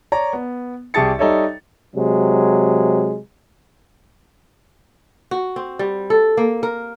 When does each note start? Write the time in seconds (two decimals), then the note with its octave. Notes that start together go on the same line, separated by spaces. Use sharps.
0.12 C#5 D5 A#5
0.33 B3
0.94 C2 G4 G#4 A5 A6 C#7
1.19 G3 D#4 A4 C#5 D#5 E5
1.95 C3 F#3 G#3
5.31 F#4
5.56 C4
5.79 G3
6.10 A4
6.37 A#3
6.63 A#4